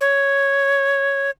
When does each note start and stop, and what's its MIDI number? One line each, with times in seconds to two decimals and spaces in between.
0.01 1.30 73